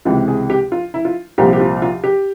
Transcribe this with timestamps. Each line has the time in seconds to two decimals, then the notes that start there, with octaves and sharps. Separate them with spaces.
0.05 C#2 C3 E3 F4
0.28 G#4
0.50 G4
0.72 F4
0.94 E4
1.05 F4
1.38 C2 A#2 F3 G4
1.53 G4
1.60 F4
1.82 F4
2.04 G4